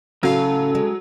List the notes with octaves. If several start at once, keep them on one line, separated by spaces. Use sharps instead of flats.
A2 C#3 F#3 A4 F5
G#3